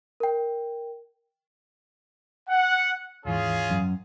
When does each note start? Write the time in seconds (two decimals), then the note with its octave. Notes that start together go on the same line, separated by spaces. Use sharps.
0.20 A#4 G5
2.49 F#5
3.25 D#2 G#2 E3 C#4 F4 G#4
3.70 F#2